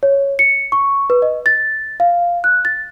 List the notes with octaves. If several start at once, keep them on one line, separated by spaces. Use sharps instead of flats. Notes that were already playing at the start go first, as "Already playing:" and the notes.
C#5
C#7
C#6
B4
D#5
A6
F5
F#6
A6